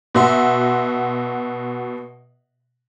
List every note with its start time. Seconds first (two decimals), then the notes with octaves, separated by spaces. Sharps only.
0.15 B2 F#4 E5 C6